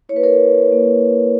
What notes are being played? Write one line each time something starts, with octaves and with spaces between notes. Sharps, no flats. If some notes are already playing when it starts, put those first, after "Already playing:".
A#3 E4 B4 C#5
A#4 C#5
A#3 E4